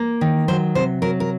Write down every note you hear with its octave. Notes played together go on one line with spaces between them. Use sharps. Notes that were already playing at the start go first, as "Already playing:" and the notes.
Already playing: A#3
D#3
F#3 C5
C3 C5
F#3 A#4
A#4